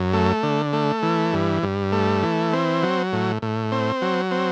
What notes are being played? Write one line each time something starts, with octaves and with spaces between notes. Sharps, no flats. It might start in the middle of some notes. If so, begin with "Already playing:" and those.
Already playing: F#2
A3
D3
A3
E3
G2
G2
A3
E3
C4
F#3
A2
A2
C4
F#3
C4